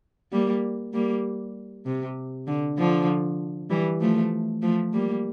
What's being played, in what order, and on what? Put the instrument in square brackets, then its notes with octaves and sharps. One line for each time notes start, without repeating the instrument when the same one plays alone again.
[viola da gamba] G3 A#3
G3 A#3
C3
D3
D3 F3
E3 G3
F3 A3
F3 A3
G3 A#3